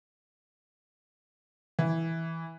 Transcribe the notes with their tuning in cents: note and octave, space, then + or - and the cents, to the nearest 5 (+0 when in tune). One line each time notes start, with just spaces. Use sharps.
E3 -10